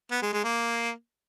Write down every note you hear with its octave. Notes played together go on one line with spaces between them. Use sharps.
B3
G#3
G#3
A#3